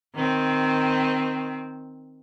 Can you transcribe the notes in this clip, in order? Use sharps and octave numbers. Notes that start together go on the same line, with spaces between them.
D#3 C4